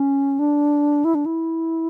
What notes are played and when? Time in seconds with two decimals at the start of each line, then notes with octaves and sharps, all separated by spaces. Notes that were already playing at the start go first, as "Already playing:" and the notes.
Already playing: C#4
0.39 D4
1.05 E4
1.15 D4
1.26 E4